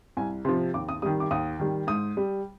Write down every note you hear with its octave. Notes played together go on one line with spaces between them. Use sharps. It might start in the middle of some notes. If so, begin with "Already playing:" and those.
C2 G#5
C3 F3 C6
D#2 D6
D#6
D#3 G3 D#6
D6
D#2 D#6
D#3 G3
G#2 D#6
G3